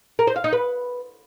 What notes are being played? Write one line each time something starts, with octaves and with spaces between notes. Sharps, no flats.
A#4
C5
F5
D#4
B4